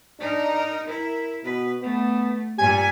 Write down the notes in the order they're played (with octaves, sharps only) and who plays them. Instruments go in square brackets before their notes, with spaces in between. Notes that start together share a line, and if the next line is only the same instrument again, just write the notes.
[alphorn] D4 [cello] D#4 A#4
[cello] E4 [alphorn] A#4
[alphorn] B2 [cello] B4
[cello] A3 [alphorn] B3
[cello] G2 A#2 [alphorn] G4 [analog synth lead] G#5